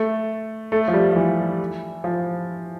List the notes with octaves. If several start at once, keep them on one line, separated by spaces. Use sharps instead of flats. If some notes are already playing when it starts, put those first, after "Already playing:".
Already playing: A3
A3
F3
G3
F3
E3
F3